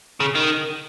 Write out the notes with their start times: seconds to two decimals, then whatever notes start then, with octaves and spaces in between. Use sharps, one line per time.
0.20 C#3
0.35 D#3